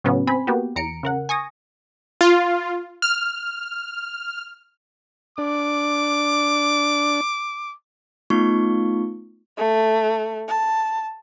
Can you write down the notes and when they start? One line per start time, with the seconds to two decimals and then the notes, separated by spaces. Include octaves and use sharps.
0.04 A2 C#3 F#3 B3 C#4
0.27 C4 G#5 B5
0.47 A#3 B3 F#4 G4
0.76 E2 A#5 C#7 D7
1.03 C#3 A#4 F#5
1.29 G#5 C#6 D#6 A#6
2.21 F4
3.02 F6
5.38 D4 D6
8.30 A3 B3 D#4 F4 C#6
9.58 A3
10.48 A5